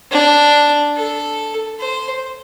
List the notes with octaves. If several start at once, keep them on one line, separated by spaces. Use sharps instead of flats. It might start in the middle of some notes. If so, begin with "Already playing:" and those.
D4
A4
C5